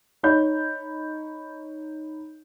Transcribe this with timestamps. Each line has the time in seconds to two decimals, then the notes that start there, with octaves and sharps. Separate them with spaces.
0.23 D#4 C#5 B5 G6